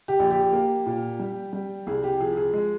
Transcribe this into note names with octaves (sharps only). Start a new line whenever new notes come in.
G4
A#1
G4
A#3
A#2
G3
G3
C2 G#4
G4
F3 G#4
G#4
G#3